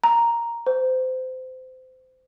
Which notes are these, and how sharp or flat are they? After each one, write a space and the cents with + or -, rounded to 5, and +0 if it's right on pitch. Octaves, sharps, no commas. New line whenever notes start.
A#5 +0
C5 -25